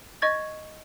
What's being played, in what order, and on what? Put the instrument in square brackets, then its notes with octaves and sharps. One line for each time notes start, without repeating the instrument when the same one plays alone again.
[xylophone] D#5 C#6 G#6 A6